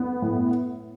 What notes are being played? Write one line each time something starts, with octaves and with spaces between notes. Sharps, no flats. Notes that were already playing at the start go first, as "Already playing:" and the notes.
Already playing: B3
A2